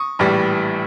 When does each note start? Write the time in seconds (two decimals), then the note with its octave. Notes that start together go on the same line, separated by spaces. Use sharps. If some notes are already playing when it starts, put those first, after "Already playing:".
Already playing: C#6 D#6
0.19 A#1 A2 E3 G3